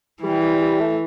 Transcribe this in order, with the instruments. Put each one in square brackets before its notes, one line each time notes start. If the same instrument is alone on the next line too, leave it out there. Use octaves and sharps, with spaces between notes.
[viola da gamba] E3 [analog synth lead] G3
[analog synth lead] G3
G3
A3